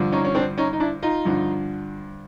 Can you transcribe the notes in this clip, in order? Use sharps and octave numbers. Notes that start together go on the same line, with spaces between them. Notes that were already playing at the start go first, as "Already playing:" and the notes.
Already playing: G2 D3 F3
C#4 D#4
C#4
C4 D4
C#4 D#4
D#4
D4 E4
D#4 F4
G2 D3 F3